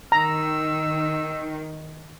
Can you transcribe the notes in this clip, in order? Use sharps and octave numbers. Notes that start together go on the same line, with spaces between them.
D#3 A#5 E6